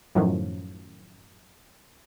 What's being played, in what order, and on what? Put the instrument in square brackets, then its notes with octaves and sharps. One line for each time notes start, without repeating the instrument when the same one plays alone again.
[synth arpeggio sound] F#2 A2 D#3 F3 F#3